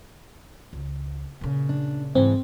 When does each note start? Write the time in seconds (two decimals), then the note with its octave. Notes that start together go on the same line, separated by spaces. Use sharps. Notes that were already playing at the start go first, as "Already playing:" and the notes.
0.73 C#2
1.41 A#2 C#3
1.69 D4
2.15 G#2 E3 C4